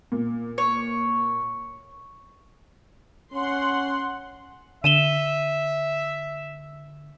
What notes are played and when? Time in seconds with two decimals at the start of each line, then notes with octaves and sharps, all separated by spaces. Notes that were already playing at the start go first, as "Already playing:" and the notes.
0.12 A#2
0.58 C#5
3.33 C#4 F#5 C6
4.84 D3 E5 D#7 E7 G7